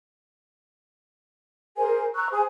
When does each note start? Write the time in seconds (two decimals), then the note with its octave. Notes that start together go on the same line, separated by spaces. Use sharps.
1.77 G#4 A#4 C5 G#5
2.15 A#5 C#6 E6 F#6
2.32 G#4 C5 G#5 D#6